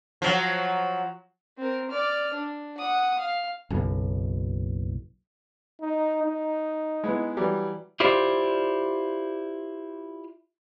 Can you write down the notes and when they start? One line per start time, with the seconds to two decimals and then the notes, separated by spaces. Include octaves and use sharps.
0.22 F3 F#3
1.57 C4 A#4
1.91 D5 F6
2.34 D4
2.77 F#5 D#6
3.19 F5
3.70 F#1 B1
5.81 D#4
6.24 D#4
7.04 G#3 B3 E4
7.37 E3 F#3 G3
8.00 E4 F4 G4 C5 D5